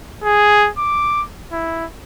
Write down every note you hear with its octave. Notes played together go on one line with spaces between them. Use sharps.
G#4
D6
E4